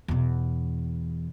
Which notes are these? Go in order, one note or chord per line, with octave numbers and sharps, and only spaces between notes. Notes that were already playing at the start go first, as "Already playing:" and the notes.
E2 B2